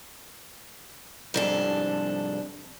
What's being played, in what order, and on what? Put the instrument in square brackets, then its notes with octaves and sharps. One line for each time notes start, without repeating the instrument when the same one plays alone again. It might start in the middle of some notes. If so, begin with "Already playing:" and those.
[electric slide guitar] F2 C3 G3 [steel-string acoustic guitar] G#2 D4 A4